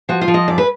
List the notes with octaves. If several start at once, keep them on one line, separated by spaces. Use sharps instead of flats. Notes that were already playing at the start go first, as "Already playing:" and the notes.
F3 F#4
F4
F3
D#5
F#2 D5
B4